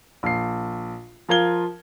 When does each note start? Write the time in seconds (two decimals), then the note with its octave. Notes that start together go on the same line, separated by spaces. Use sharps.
0.23 A#1 C7
1.29 F3 F4 A#4 G#6 G7